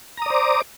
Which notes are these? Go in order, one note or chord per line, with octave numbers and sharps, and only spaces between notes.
C5 D5 A#5 D6 D#6